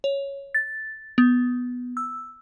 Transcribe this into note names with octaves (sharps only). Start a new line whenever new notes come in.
C#5
A6
B3
E6